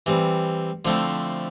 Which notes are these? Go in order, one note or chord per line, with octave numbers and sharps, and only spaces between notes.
E3 G3 C4
D3 F3 A3 C4 E4